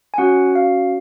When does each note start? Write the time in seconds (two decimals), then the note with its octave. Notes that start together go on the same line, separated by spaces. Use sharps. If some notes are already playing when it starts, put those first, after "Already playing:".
0.14 G#5
0.18 C#4 F#4 F#5
0.56 F5